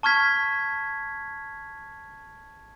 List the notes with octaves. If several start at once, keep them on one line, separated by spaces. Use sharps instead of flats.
A5 C#6 F6 G#6 B6